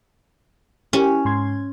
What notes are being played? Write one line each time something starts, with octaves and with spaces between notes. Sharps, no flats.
C#4 E4 G4
G#2 C6 G#6